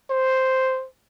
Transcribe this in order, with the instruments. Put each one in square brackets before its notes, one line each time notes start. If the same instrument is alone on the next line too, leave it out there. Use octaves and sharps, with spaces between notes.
[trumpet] C5